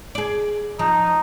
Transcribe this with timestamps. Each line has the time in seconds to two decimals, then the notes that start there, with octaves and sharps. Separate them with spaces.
0.15 G#4 D5
0.79 F3 D#4